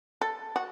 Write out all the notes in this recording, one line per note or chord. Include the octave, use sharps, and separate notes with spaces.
A4
F#4